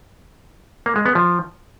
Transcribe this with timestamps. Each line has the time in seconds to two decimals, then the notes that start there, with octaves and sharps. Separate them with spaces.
0.86 A#3
0.96 G#3
1.06 B3
1.15 F3